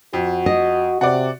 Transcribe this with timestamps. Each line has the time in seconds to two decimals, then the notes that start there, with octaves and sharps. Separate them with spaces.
0.13 F2 F#4
0.46 D#5
1.01 C3 F#4 D5